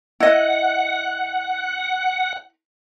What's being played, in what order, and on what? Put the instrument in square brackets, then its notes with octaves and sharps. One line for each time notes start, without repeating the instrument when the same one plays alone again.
[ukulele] E4 D#5 [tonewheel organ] F#5